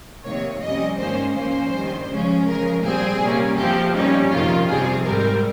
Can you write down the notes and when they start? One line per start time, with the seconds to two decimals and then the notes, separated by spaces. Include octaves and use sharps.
0.25 C3 D#3 A#3 C#5
0.62 F2 C3 G3 C#4 D#5
0.98 G#2 D#3 A#3 C#4 C5
1.35 A#2 F3 A#3 C#4 C5
1.73 G2 D#3 G3
2.09 C#3 F3 G#3 C#4
2.46 C#3 F3 G#3 A#4
2.83 A#2 G3 C4 G#4
3.20 C3 G3 A#3 C#4
3.57 F2 C3 F3 C4 G4
3.94 A#2 G3 C#4 D#4
4.31 F2 C3 D#3 F4
4.68 F2 C3 G3 G#4
5.04 G#2 G3 C4 A#4